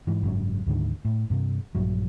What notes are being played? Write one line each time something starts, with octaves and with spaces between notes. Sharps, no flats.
G#2 E3
F#1 G#2 F#3 C#4
D2 G#2 D3 D#3
A2
G2 C3
A#1 G2 F#3